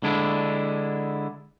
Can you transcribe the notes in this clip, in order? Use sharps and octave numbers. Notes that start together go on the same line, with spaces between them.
D3 G#3 D4 E4